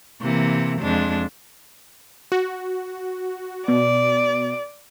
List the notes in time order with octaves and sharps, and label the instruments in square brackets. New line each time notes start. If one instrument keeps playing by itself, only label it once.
[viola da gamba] C3 E3 A#3
F2 G#3 D4
[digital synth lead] F#4
[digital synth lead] B2 [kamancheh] D5